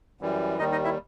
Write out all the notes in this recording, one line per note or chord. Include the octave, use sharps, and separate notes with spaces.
F#2 E3 G3
D#2 D#3 G3 D#4 D#5
D#4 D#5
E4 E5